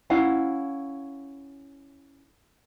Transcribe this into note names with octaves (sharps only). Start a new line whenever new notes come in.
C#4 E4 F5 F#5